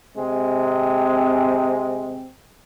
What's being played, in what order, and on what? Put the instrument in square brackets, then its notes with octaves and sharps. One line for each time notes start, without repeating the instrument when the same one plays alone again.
[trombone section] C3 G#3 C4